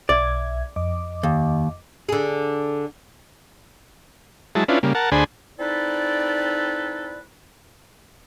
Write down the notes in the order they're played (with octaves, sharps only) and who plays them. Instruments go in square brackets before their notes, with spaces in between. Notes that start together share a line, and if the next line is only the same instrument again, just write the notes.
[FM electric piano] B1 E5 G#6 [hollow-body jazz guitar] D5
[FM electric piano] F2 D#5 D6
[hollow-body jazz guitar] D#2
[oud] D3 G#4
[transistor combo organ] F#3 G#3 E4 A5
C#4 D4 E4 F4 B4
C#3 G3 A#3
A#4 F#5 A5
D2 D4 G#4 C5 G#5 B5
[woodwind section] C4 D#4 E4 A4 B4 D5